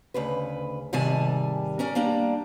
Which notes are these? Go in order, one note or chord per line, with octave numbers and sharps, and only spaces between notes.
D2 C#3 B4
G#2 C3 D#3 G3 G#5 A5
C#4 A#4 D5
G3 A#3 D4 A#5